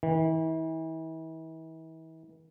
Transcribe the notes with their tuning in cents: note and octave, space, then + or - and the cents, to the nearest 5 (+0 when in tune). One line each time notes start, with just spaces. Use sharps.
E3 -40